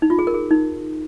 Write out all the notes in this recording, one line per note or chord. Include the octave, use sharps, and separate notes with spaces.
D#4
F4
G#4
A#4
G#4
D#4